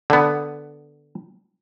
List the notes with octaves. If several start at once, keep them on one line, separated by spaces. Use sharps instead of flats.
D3 B3